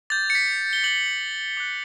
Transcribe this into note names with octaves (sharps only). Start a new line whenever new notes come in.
D6 G6 A6
C#7
B6
G7
D6 G6 F#7
D6 F#6